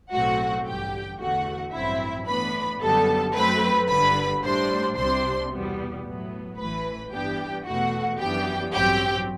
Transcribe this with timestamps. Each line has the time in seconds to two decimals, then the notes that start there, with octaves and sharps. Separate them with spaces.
0.12 B1 A2 F#3 A3 C4 F#4 F#5
0.66 A1 G2 D3 G4 G5
1.20 E2 D3 A3 F#4 F#5
1.73 A1 G2 F#3 C4 E4 E5
2.27 A2 E3 B3 D4 B4 B5
2.81 F#2 D3 G3 B3 A4 A5
3.35 F#2 F#3 A3 C4 B4 B5
3.89 G1 G2 D3 G3 B4 B5
4.43 A2 G3 D4 C5 C6
4.96 C2 C3 G3 D4 C5 C6
5.51 E2 B2 G3 B3
6.05 A2 F#3 B3
6.58 A1 A2 E3 B4 B5
7.12 G2 E3 B3 D4 G4 G5
7.65 E2 B2 A3 F#4 F#5
8.19 F#2 E3 B3 D4 G4 G5
8.74 A1 G2 F#3 C4 G4 G5